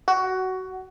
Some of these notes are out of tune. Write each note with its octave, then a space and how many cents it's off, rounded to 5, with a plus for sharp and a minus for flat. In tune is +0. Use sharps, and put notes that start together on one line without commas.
F#4 +15